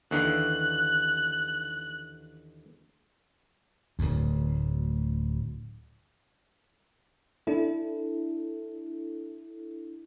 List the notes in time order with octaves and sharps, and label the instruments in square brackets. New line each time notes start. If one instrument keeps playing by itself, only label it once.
[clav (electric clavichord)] D#2 D3 E3 [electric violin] F#6
[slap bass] D1 D2
[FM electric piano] D4 E4 A4